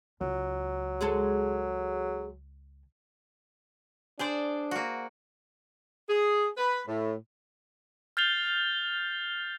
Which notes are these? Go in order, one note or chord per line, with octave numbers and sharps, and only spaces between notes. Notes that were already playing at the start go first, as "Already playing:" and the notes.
C#2 F#3
G#3 G#4 A4
D4 G#4 C5 D5
A#3 F#4
G#4
B4
A2
F6 G6 A6 C7 F7 G7